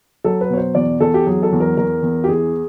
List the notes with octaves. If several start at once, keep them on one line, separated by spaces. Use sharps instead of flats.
F#3 A4
B4
B2 C#5
C5
E2 D5
E2 A4
G4
F#3 G#4
A4
E2
A#4
E2 A#4
E2
G4
E3 G#4